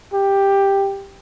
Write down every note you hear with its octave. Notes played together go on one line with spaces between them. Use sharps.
G4